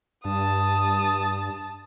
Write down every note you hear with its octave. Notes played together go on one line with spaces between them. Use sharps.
G2 A5 D#6